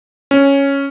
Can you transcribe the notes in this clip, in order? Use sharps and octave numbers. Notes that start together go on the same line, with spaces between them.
C#4